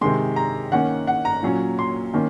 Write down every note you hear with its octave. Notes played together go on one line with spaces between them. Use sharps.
C3 D#3 G#3 C6
A#5
D#3 A#3 C#4 F#5
F#5
A#5
A#2 F#3 C#4
C6
D#3 A#3 C#4